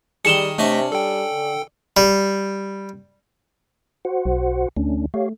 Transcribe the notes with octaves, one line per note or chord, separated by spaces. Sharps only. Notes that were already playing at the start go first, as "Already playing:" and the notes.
D#3 G3 G#4 C#7 E7 G7
C3 A3 C#4 D4 D#5 E5
G3 A4 G5
D3
G3
F#4 C5 F#5
B1
D2 A3 C#4 D4
A3 G4 C#5 F5